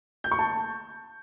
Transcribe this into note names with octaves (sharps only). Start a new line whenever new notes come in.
G6
C#6
A5